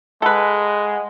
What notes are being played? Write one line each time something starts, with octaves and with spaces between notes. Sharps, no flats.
G#3 A4 B4 F#5